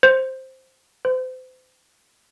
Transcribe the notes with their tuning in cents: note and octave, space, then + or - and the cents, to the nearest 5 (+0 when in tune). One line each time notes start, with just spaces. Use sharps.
C5 +5
C5 -35